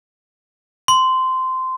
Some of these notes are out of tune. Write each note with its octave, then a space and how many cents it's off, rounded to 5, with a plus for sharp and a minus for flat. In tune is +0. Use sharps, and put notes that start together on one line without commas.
C6 -15